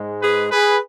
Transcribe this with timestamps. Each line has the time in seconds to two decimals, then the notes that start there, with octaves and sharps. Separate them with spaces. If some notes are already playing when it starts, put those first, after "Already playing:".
Already playing: G#2 G#3
0.22 G#4 B4
0.51 G#4 B4